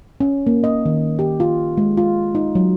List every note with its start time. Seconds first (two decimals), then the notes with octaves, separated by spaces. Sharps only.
0.20 C#4
0.47 A#3
0.64 D#5
0.86 D#3
1.19 G4
1.40 F4
1.77 G#3
1.97 F4
2.35 D#4
2.55 F#3